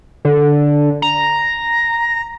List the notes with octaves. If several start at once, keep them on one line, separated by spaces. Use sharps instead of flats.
D3
A#5